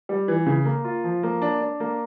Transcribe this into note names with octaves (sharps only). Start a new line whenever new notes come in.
G3
E3
C#3
A#3
F4
F3
A#3
D4
D4
A#3